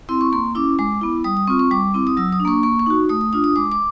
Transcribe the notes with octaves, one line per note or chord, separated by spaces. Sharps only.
C4 E4 C6
C#6
A#3 C6
C#4 E4 D6
G#3 D6
B3 E4
G3 D#6
D#6
C4 F4 C#6
C#6
G3 D6
C4 E4
D#6
F#3 E6
D#6
D4
A#3 C#6
A#3 C#6
C#6
D#4 F#4
A3 D#6
D#6
D4 F4 D#6
D#6
G#3 D6
D6